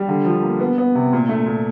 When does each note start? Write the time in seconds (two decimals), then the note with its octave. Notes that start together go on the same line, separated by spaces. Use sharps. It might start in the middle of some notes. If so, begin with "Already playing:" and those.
Already playing: G3
0.08 D3
0.25 F3
0.42 A#3
0.60 B3
0.78 B3
0.95 C3
1.13 A#2
1.29 A3
1.46 A#2